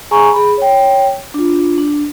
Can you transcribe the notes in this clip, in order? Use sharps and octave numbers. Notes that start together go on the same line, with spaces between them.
G#4 G#5 A#5 C#6
G#4 B5
C#5 G5
D4 F4
D4